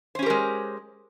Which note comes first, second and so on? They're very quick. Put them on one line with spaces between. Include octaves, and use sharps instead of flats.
C5 C#4 G4 A#4 G#3